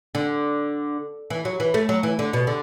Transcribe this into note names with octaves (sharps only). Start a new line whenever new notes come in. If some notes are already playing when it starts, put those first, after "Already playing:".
D3
E3
F#3
E3
A3
F#3
E3
D3
B2
D3